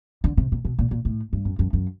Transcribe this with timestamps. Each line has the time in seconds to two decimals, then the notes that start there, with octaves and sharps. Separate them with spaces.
0.24 D3
0.37 C3
0.52 A#2
0.65 B2
0.79 A#2
0.91 A#2
1.05 A2
1.33 G2
1.45 F#2
1.59 F#2
1.73 F#2